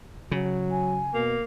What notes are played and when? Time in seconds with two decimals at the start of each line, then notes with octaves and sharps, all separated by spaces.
0.32 C#3 F#3
0.71 G#5
1.14 B2 A#3